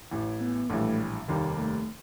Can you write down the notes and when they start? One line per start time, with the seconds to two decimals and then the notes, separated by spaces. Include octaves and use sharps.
0.11 A1 A2 E3
0.41 B3
0.70 A#1 A2 E3 G3 A3
1.28 F1 D#2 D#3 G3 A#3
1.59 A3